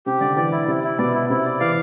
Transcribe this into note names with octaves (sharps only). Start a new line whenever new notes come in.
C3 G4
D3 D5
E3 D5
E4
C3 E4
E4
B2 D5
E4
C3 E4
D5
E3 F5